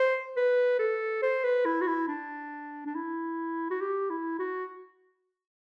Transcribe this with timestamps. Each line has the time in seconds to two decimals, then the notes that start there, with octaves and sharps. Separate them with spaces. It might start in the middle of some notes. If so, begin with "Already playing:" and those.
Already playing: C5
0.37 B4
0.79 A4
1.22 C5
1.44 B4
1.65 E4
1.81 F#4
1.87 E4
2.08 D4
2.87 D4
2.95 E4
3.70 F#4
3.81 G4
4.10 E4
4.39 F#4